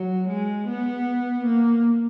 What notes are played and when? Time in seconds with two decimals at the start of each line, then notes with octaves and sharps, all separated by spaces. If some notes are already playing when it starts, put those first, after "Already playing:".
Already playing: F#3
0.28 G#3
0.68 B3
1.45 A#3